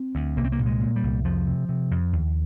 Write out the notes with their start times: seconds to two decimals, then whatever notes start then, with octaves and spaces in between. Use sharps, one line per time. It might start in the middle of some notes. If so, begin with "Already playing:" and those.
Already playing: C4
0.15 D2
0.37 C2 A#3
0.45 C4
0.52 A#3
0.59 A#2
0.66 G#3
0.81 A#2
0.96 G3
1.03 C2
1.25 F2 F3
1.47 C3
1.69 C3
1.91 F2
2.13 D#2